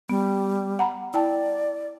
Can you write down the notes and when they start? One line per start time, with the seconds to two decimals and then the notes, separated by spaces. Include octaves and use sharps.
0.10 G3 B3
0.79 F#5 A#5 B5
1.14 E4 D5 G5 A5